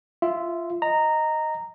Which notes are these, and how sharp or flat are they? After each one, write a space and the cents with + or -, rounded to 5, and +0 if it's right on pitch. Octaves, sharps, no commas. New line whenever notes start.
F4 -15 E5 +0
D#5 +0 A#5 -10